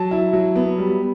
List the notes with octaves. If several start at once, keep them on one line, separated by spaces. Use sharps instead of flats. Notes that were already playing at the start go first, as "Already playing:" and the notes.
Already playing: F#3 A5
E4
F#3
B3
G3